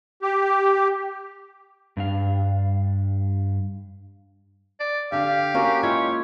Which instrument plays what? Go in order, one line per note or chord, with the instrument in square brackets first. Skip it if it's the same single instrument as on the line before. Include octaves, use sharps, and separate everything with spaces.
[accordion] G4
[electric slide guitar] G2 D4 F5
[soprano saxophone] D5
[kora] D3 D4 [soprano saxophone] G4 [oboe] F5
[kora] A#3 C#4 F#4
[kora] G#3 E4 F4 [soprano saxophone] C#5